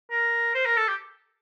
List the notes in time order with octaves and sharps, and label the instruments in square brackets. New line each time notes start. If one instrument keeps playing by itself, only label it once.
[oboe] A#4
C5
A#4
A4
G4